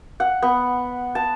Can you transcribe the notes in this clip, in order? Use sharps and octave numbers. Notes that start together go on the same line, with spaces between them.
F#5
B3
A5